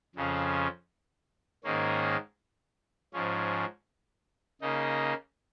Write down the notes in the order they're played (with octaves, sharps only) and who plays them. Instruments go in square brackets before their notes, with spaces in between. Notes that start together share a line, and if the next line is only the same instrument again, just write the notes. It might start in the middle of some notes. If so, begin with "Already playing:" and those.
[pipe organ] F2 C#3 F3 C#4
G#2 D#3 A#3 C#4
G#2 F3 C#4
C#3 A#3 D#4